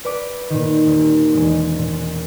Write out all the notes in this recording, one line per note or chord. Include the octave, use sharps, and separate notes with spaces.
B4 D5 B5 D6
A#2 D#3
D#1
E1 G#3
A#2